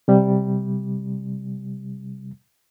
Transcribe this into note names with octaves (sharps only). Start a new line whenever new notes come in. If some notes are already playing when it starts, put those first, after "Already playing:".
C3 G3